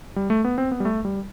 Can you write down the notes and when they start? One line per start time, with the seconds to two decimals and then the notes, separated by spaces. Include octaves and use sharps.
0.16 G3
0.30 A3
0.45 B3
0.58 C4
0.71 B3
0.80 G3
0.85 A3
1.05 G3